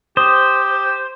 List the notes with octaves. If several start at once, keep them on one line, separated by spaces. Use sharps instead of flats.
G4 C5 D#6